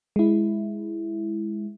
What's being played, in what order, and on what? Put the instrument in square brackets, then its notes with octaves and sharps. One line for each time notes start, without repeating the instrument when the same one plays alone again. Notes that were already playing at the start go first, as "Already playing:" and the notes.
[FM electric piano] G#3 E4